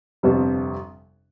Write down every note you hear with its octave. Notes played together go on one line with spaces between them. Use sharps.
G1 F2 C3 G3